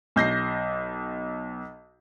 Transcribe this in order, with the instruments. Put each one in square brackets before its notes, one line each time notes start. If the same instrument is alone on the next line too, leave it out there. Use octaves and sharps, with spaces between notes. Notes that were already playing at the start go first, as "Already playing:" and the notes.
[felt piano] B1 G6 A#6 C7